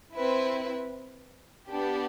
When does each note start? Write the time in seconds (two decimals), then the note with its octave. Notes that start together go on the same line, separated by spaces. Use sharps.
0.15 C4 E4 B4
1.67 B3 D4 G4